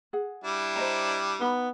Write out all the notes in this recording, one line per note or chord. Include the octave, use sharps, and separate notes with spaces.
G#4 F#5
G3 D4 E4
C5 D#5 A#5
B3 D#4 F#5 B5